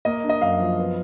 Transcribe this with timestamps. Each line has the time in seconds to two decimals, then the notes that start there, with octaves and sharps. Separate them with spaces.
0.05 A#3 D#5
0.24 D4
0.29 D#5
0.41 F#2 F5
0.60 F3
0.79 B3